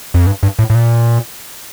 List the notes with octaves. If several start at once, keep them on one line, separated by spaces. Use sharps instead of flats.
F2
G2
G2
A2
A2
A#2